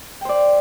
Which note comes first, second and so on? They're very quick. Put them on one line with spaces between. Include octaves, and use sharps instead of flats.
G5 C5 D5